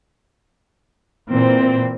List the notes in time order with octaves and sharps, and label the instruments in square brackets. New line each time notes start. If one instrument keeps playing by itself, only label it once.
[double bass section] A#2 [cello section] E3 C4